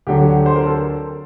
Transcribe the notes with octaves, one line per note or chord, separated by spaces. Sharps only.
D2 D3 F#3 G4
C5
A#4
A4